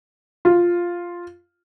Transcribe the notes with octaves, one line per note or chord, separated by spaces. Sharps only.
F4